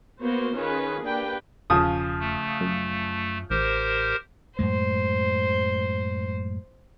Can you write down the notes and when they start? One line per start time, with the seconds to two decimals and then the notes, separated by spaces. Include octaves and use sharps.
0.23 A#3 B3 F#4 A#4 C5
0.58 D#3 C#4 F4 G#4 B4
1.06 A#3 D4 G4 B4 G5
1.70 E1 C#3 F3 D#6
2.20 A3
2.61 F#2
3.50 A1 G4 A#4 C5
4.59 F#2 A2 G#3 C5